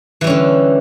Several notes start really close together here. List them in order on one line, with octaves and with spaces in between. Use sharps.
E3 G3 C#4 D3